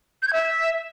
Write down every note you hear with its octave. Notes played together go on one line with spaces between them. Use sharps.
G6
G#6
E5